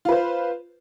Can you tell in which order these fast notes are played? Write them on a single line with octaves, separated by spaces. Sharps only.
F4 B4 C5